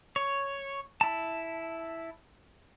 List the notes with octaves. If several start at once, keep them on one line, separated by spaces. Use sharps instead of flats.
C#5
E4 A5